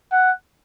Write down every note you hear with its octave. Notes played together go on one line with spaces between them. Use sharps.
F#5